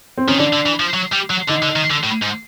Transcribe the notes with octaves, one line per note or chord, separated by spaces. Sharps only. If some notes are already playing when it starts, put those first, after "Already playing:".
C4
D#3 C#4
D3 D4
D3
E3
F3
F#3
G3
F#3
D3 D#4
D3
D#3
D3
A2
G#2